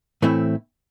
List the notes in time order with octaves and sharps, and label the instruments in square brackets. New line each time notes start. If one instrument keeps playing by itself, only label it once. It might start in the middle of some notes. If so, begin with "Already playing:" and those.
[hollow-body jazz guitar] A2 E3 A3 C4 E4